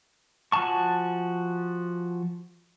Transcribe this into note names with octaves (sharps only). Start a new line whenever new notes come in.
F3 F#4 G#5 A5 C#6